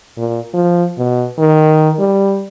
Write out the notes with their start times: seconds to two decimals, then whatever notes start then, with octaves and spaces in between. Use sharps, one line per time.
0.17 A#2
0.54 F3
0.98 B2
1.39 D#3
1.99 G3